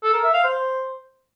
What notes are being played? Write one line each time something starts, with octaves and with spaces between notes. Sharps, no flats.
A4
A#4
E5
F5
C5